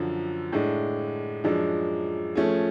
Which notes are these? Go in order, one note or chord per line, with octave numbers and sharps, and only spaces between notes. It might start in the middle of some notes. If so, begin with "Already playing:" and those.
Already playing: F#2 D3 F3
A2 G#3 D4
F#2 F3 G#3 D4
F3 A3 C#4 G#4